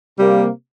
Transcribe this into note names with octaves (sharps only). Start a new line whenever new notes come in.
C3 G3 A#3